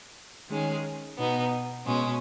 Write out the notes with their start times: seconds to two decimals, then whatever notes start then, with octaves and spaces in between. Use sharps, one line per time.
0.48 D#3 G#3 C#4 G#4
1.17 B2 B3 D#4
1.86 B2 G#3 C#4